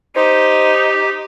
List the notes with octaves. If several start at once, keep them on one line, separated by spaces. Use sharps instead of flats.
D#4 G4 C5